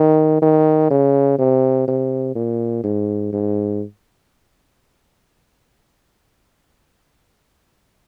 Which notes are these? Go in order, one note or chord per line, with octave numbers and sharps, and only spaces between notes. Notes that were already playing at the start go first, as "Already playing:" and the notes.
Already playing: D#3
D#3
C#3
C3
C3
A#2
G#2
G#2